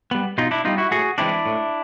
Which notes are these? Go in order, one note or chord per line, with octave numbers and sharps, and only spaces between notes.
G3 B3
B2 D#4 F4
D4 E4
G3 B3 D#4 F4
E4 F#4
A2 F#4 G#4
E3 G#3 C4 D4 E4
A2